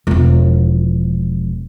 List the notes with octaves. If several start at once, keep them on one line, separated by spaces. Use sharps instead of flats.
E1 F3